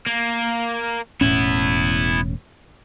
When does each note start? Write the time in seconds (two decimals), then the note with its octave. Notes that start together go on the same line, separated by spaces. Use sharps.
0.07 A#3
1.21 E1 A2 B3 C#4 E4